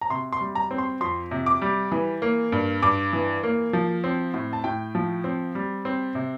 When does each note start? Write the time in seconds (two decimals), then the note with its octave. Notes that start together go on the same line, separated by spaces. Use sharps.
0.01 A#5
0.10 C3 C6
0.33 C6
0.41 G3
0.55 A#5
0.71 C4
0.78 C6
1.01 F2 C6
1.31 C3
1.46 D6
1.62 G3
1.92 E3
2.22 A#3
2.52 G2
2.82 G2 D6
3.13 E3
3.43 A#3
3.73 F3
4.04 C4
4.34 A2
4.53 A5
4.64 A2 G5
4.95 F3
5.24 C4
5.55 G3
5.85 C4
6.15 C3